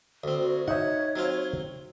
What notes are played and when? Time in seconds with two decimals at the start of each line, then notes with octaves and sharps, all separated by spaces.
0.24 D2 C4
0.39 F#4
0.68 D#4 C#5 E5 F#5
1.16 F#3 C4 F4